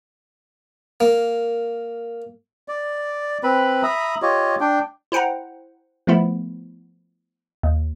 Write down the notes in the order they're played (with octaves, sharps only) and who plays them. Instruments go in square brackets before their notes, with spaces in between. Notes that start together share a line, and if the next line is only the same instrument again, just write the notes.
[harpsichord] A#3
[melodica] D5
C4 B4 B5
E5 A#5 B5 D#6
F4 G4 C#5 D#5
D4 G5
[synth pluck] E4 C5 F#5 G5 A#5
F3 A3 B3 E4
D#2